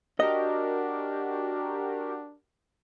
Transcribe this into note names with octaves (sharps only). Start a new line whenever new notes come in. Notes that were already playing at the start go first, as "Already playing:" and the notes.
D4 F#4 G4 A#4 D#5